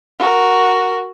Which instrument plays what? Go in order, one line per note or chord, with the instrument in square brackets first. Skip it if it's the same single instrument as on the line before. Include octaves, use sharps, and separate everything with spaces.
[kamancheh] F#4 A#4